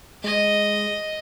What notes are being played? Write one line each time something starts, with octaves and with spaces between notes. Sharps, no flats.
G#3 D#5